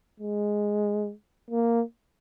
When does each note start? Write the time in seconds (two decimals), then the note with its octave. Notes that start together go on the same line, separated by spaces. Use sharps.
0.20 G#3
1.51 A#3